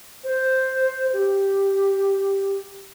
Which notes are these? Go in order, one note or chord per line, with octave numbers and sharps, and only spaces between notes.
C5
G4